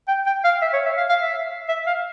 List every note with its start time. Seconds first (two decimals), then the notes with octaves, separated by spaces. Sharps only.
0.08 G5
0.26 G5
0.44 F5
0.62 E5
0.73 C#5
0.86 E5
0.97 F5
1.09 F5
1.21 E5
1.69 E5
1.87 F5